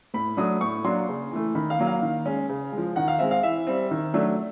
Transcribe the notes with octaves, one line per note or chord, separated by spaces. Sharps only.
A2 B5
F#3 A3 D4 D#6
A2 C#6
F#3 A#3 D4 C6
C#3
E3 A3
D#3 B5
F5
F#3 A#3
F5
D#3
G#3 C#4
C#3
F3 G#3
D#3 F#5
F5
G#3 C4 E5
F5
E3 E5
G3 C4
D#3
F#3 A3 D4